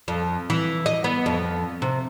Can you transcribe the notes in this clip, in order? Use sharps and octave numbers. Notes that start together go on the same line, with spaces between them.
F2
E3
D#5
B3
F2
C3